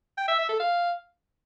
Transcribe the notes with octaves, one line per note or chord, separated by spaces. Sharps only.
G5
E5
E5
A4
F5